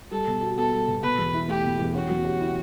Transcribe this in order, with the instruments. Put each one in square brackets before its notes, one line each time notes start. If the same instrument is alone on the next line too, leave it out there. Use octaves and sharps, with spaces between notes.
[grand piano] G3 [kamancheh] A4
[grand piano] B2
F#4
[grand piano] B3 [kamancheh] A4
[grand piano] G3
B2
[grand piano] B2 [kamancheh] B4
[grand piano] E2
E4
[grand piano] A3 [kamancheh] G4
[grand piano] B2
E2
[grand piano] C#4 [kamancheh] F#4
[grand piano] F#3
G4
E4